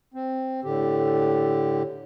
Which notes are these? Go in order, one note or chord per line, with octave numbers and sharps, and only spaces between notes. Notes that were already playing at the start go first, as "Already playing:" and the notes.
C4
A2 D3 G4